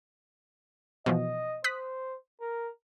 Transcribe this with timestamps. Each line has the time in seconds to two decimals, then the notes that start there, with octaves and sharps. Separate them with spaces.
1.06 B2 E3 F3 D#5
1.64 C5 D#6 F#6 B6
2.41 A#4